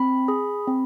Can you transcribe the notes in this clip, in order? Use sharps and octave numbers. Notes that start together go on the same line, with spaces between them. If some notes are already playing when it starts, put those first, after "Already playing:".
Already playing: C4 B5
G#4
C4